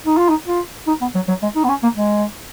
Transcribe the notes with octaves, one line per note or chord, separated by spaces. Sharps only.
D#4
F4
D#4
F4
D#4
B3
F#3
F#3
G#3
D#4
B3
C#4
A#3
G#3